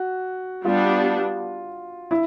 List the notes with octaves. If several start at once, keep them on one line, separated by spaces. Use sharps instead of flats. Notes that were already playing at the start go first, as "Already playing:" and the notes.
Already playing: F#4
G3 B3 D4 F4
E4